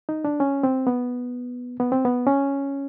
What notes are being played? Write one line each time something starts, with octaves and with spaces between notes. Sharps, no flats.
D#4
D4
C#4
C4
B3
B3
C4
B3
C#4